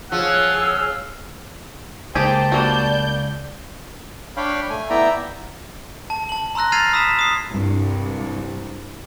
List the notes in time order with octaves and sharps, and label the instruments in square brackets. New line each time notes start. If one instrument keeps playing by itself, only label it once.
[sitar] F3 [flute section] G#4 C#5 [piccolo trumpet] F#5 [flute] E6
[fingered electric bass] C#2 [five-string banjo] A#3 G4 G#4 [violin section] C5 G5 [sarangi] A5
[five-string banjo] G3 A#3 F#4 [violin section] D5 G6
[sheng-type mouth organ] D4 C#5 F5 G5 B5
A3 G#5
B3 E4 D5 E5 G5 A#5
[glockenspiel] A5
A5 F#7
A#5 C6 E6 F#6 A#6
F6 G#6 A6 C7 D#7 F7
B5 D#6 E6 B6 E7
D#6 C7
[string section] C2 G2